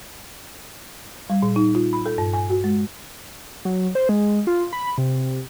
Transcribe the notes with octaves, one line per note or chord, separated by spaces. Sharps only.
G3
A#2
D#4
F4
B5
A4
G2
G#5
F#4
G#3
F#3
C5
G#3
F4
B5
C3